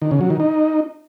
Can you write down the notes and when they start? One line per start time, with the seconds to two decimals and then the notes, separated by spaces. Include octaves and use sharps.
0.02 D#3
0.11 C#3
0.21 F#3
0.30 D#3
0.40 D#4